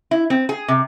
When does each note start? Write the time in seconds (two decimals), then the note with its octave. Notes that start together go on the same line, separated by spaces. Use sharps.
0.11 E4
0.30 C4
0.49 G#4
0.68 C3